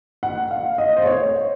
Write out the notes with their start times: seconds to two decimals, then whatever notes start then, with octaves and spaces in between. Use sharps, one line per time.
0.23 F#5
0.51 F5
0.78 D#5
0.97 C5
1.06 C#5